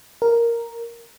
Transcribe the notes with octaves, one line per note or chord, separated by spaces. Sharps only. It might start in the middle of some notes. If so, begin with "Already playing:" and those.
A#4